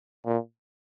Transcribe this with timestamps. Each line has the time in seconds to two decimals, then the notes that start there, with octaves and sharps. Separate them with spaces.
0.26 A#2